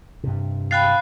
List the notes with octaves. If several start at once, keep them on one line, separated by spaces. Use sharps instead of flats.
G2 C3
F5 G5 B5 F#6 A6 C7